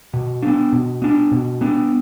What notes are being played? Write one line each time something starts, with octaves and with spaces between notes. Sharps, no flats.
B2
B3 D4
B2
B3 D4
B2
B3 D4